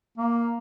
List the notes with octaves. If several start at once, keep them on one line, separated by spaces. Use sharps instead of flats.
A#3